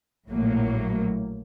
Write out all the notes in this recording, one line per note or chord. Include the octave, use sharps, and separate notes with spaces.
A#1 A2 F#3 A#3